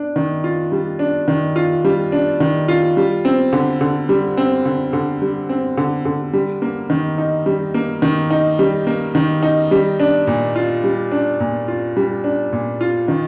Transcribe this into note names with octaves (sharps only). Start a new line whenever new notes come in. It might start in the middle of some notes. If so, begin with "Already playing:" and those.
Already playing: D4
D#3
F4
G3
D4
D#3
F4
G3
D4
D#3
F4
G3
C4
D3
D3
G3
C4
D3
D3
G3
C4
D3
D3
G3
A#3
D#3
D#4
G3
A#3
D#3
D#4
G3
A#3
D#3
D#4
G3
D4
A#2
F4
G3
D4
A#2
F4
G3
D4
A#2
F4
D#3